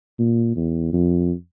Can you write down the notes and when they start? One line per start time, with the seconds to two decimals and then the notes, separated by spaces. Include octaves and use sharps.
0.19 A#2
0.56 E2
0.93 F2